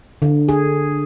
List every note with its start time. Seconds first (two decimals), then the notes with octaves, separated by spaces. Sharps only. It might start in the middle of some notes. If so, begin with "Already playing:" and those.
0.22 D3
0.49 G#4